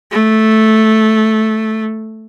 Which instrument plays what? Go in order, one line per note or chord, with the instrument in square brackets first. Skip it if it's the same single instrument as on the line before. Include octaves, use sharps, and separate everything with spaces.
[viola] A3